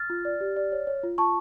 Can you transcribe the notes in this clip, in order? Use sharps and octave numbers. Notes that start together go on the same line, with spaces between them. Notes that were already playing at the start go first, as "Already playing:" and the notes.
Already playing: F6 A6
F4
D5
G4
D5
C#5
C#5
F4
F4 A5 C#6